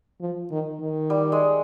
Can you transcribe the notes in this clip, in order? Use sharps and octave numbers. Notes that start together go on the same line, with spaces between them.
F3
D#3
D#3
G3
G#3